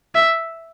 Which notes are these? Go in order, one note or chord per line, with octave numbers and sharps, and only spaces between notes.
E5